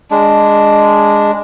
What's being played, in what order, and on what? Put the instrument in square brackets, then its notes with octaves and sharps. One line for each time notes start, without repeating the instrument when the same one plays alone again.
[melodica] G#3 D4